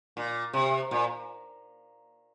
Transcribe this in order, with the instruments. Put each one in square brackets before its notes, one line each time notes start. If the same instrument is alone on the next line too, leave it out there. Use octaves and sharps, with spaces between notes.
[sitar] A#2
C3
A#2